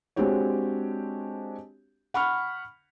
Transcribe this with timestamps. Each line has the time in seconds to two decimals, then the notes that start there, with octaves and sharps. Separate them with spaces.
0.16 G#3 C4 D4 F#4 G4 C#5
2.14 F#5 B5 C#6 F6